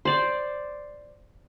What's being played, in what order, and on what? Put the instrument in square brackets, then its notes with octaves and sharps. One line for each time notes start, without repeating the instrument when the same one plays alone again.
[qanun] C5 D5